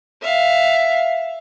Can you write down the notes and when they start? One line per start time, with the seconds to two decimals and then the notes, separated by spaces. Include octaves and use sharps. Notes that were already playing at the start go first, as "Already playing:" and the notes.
0.22 E5 F5